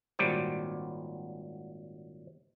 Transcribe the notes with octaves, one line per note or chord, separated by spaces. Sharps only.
G#1 A#2 F#3 G3 G4 C5